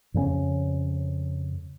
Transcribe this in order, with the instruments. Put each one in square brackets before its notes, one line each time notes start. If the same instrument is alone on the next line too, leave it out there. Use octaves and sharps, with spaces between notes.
[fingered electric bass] F2 C#3 A#3 C#4